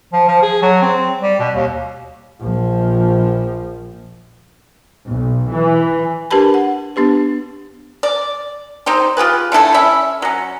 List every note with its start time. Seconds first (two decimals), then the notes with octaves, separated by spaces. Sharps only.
0.13 F3
0.28 F3
0.42 G#4
0.62 F#3
0.82 C4
1.22 G3
1.39 B2
1.55 D#2
2.41 A#1 F3
5.07 B1
5.51 E3
6.31 D4 G4 A#4 B4 A5 B5
6.54 F#5
6.96 B3 D4 G4 B4
8.03 D5
8.86 C4 D#4 G4 C5
9.17 F4 G4 G#4 B4
9.52 D3 A3 E4 A4
9.74 C#4 E4 E5 B5
10.22 F#3 C#4